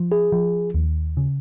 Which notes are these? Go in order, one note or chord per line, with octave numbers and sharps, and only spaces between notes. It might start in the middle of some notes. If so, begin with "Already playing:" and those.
Already playing: F3
G#4
F3
D#2
C#3